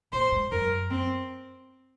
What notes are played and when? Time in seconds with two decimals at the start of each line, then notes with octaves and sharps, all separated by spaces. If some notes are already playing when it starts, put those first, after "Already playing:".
0.13 A#2 C5
0.32 G#2
0.52 F#2 A#4
0.91 C4